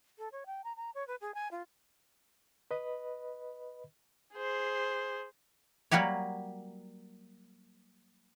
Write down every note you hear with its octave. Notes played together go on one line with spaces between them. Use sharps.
A4
C#5
G5
A#5
A#5
C#5
B4
G#4
G#5
F4
B4 D#5 B5
G#4 C5
F#3 G3 A#3 F#4 G4 C#5